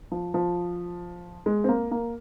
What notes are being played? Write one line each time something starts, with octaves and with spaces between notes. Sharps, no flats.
F3
F3
G#3
C4
A#3
A#3